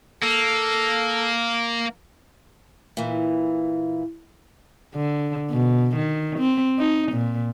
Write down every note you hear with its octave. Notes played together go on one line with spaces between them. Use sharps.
A#3 A4
A#2 E3
D3
B2
D#3
C4
D#4
A#2